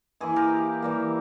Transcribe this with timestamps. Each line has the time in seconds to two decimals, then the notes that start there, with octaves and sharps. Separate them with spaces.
0.20 E3 A#3 E4 G#4 C5
0.36 G4 A#4
0.82 E3 G3 A#3